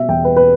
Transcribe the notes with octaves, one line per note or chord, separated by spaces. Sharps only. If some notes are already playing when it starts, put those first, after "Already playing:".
Already playing: B2 E5
E2 G5
B4
B4